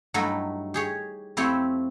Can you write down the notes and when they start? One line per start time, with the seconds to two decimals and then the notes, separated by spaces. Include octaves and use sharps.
0.14 G2 F#3 A3 D#4 E4
0.74 G4 G#4 C#5
1.37 F2 A3 C4 E4 G4 C#5